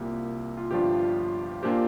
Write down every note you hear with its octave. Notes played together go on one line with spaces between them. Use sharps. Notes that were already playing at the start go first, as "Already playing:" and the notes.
Already playing: C2 A#2 A#3 G4
F4
G1 G2 F3 D4 F4 G4
A#2 A#3 D4 F4 G4 C5